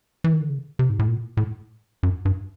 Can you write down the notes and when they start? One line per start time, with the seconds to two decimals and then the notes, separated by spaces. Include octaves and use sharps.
0.24 E3
0.33 D#3
0.41 D3
0.50 C#3
0.79 C3
0.90 G#2
0.99 A2
1.08 A#2
1.37 A2
2.03 F#2
2.25 G2